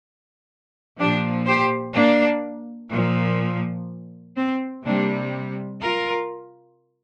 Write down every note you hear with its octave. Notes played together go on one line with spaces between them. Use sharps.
A#2 F3 D4 G4
G4 C5
A#3 D4
A#2 F3
C4
C3 G3 A#3 D4
F4 A#4